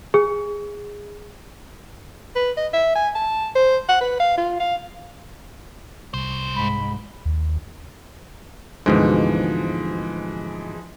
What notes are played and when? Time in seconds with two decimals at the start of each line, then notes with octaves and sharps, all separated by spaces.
0.14 G#4
2.35 B4
2.57 D#5
2.73 E5
2.95 G#5
3.15 A5
3.55 C5
3.89 F#5
4.01 B4
4.20 F5
4.37 F4
4.60 F5
6.14 C2 C#3 C5
6.55 G#2 B5
7.25 D#2
8.86 D2 G#2 B2 E3 F3 G#3